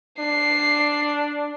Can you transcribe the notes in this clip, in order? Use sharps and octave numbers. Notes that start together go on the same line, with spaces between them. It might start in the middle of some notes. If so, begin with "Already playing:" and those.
D4 C7